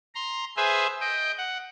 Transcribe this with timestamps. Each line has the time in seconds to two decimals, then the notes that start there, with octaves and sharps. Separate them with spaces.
0.15 A#5 C6
0.57 G#4 B4 C5 E5 G#5
1.01 D#5 G5
1.38 F#5